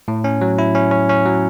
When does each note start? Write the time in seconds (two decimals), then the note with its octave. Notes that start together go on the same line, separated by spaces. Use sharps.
0.08 A2
0.24 C#4
0.41 F#3
0.58 E4
0.75 C#4
0.91 C#4
1.09 C#4
1.25 F#3